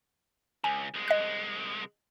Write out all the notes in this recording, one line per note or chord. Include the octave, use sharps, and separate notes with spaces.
C#2 G#5
C2 G#3
D#5 F#6